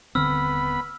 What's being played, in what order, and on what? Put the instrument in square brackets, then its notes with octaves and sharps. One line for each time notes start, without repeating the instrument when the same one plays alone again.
[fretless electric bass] D#1 D3 C4 [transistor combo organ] B3 B5 [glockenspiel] E6 F6